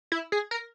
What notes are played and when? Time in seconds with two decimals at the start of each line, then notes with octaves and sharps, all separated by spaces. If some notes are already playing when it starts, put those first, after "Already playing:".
0.12 E4
0.32 G#4
0.51 A#4